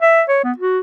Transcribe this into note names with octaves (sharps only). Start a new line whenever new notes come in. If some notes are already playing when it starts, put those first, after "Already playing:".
E5
C#5
B3
F#4